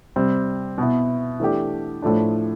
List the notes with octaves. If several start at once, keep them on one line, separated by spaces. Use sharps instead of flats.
C3 G3 C4
B2 B3 E4
E3 A3 D4 G4
A2 F3 A3 D4